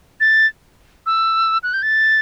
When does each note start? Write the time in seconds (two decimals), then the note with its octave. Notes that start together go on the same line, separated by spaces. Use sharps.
0.20 A6
1.06 E6
1.63 F#6
1.73 G6
1.82 A6